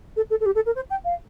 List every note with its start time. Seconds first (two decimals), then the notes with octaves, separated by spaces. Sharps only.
0.16 A4
0.30 A4
0.40 A4
0.45 G4
0.55 A4
0.66 A#4
0.75 C5
0.90 G5
1.05 F5